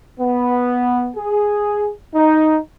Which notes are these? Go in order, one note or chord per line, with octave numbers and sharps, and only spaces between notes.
B3
G#4
D#4